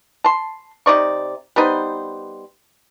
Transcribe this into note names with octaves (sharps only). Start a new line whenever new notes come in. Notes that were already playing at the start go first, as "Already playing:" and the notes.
A5 C6
C3 D#4 D5 C#6
G3 B3 D#4 C5